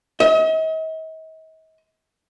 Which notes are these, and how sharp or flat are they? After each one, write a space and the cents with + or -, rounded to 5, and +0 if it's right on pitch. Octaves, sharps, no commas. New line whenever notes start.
D#5 +45